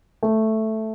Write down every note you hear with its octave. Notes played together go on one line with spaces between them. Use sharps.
A3